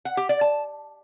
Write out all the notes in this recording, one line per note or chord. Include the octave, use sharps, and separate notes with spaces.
F#5
G4
D5
A5